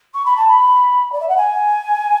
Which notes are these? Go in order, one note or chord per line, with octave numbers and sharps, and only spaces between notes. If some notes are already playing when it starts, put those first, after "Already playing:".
C#6
B5
A5
B5
D5
E5
F#5
G#5